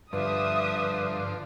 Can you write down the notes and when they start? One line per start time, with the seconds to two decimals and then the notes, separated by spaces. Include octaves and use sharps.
0.13 G2 D3 F3 B4 E5 D#6